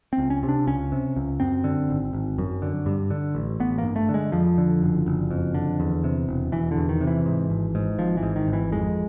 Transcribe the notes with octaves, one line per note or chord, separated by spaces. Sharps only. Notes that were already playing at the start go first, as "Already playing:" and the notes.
C4
C#2
C#4
C3
D4
C#2 C#4
C3
C#2
F#2 C4
D3
G#1
G#1
F#2
D3
G2
D3
A1
A1 B3
A#3
G2
A3
D3
G#3
F2 F3
D3
F#1
F#1
F2
D3
E2
C3
E1
E1 E3
D3
E2
D#3
C3
E3
G#2
G#1
G#2
G#1 F3
E3
G#2
D#3
G#1
E3
F2 G#3